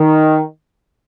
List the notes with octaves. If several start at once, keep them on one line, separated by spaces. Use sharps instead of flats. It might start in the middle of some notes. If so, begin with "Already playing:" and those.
Already playing: D#3